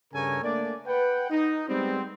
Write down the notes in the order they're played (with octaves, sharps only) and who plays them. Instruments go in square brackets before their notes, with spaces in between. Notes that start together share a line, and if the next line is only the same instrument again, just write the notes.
[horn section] G2 C#3 A4 A#4 C#5 G#5
A3 A#3 D4 D5
B4 F#5 G5
D#4
G3 G#3 B3 C4